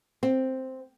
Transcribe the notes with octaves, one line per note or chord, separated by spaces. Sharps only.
C4